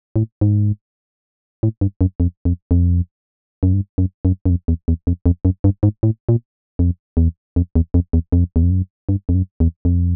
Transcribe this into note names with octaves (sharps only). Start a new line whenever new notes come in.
A2
G#2
A2
G2
F#2
F2
F2
F2
F#2
G2
F#2
F#2
F#2
F2
E2
E2
F2
F2
F#2
G2
G#2
A2
A#2
F2
E2
F2
E2
F2
E2
F2
E2
F2
F#2
G2
F2
F#2
E2
F2